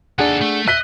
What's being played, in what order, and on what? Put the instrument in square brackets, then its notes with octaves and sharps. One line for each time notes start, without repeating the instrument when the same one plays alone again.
[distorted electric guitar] D#2 A4 [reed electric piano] D4 G#4 F#5
[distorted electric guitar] A3
[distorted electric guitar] D#5 [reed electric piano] E5 [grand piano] F#6 B6 G7